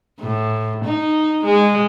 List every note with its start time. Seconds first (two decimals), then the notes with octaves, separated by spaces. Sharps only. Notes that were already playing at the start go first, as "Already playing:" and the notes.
0.21 A2
0.85 D#4
1.45 G#3